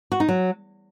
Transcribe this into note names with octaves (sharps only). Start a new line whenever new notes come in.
F#4
D#4
F#3